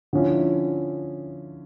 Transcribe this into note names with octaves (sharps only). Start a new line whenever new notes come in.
D3 F3 C#4 E4